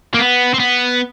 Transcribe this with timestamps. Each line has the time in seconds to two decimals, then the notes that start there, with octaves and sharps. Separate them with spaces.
0.14 A#3
0.19 B3
0.54 C4
0.60 B3